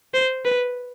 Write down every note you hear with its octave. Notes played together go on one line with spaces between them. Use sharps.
C5
B4